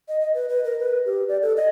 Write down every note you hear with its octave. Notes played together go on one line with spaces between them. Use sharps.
D#5
D#5
B4
B4
A#4
B4
G4
D5
A4
D#5